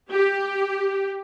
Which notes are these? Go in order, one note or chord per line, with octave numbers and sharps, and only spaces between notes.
G4